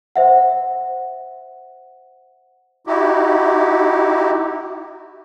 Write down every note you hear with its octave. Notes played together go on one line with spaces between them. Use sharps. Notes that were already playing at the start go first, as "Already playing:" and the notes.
C5 E5 F#5
D#4 E4 F#4 G4